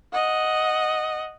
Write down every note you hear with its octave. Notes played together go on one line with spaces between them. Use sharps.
D#5 F#5